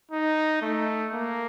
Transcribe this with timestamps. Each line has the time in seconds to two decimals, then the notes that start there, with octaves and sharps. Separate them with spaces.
0.11 D#4
0.62 A3
1.13 A#3